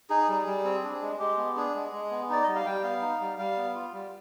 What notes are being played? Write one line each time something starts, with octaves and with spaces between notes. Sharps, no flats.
D#4 G#4
G3
G3
C4
D4
G#3
G#3 G4
B3
D4 G#4
G#3
G#3
B3
D#4 D5
G3 D#5
F5
G3 G5
B3 F5
D#4
G3
G3 F5
B3
F4
G3